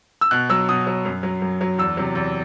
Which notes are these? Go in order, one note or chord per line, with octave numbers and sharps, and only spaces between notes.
E6
B2 F#6
F#3 E6
B2 D#6
F#3
F#2
F#3
F#2
F#3
E2 E6
C3 F#3
E2